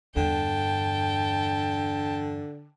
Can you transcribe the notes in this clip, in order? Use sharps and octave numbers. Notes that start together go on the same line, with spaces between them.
E2 G2 D3 G5 A5